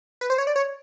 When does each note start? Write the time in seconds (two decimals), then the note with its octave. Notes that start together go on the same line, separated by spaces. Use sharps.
0.21 B4
0.30 C5
0.38 C#5
0.47 D5
0.56 C#5